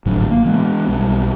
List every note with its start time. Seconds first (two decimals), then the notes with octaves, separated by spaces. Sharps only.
0.06 G#1 A2 D3 F#3
0.31 A#3
0.45 E3 G#3 B3
0.88 B1 G3